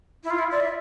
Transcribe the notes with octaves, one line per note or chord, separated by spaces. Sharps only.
E4
F4
E4
D5
E5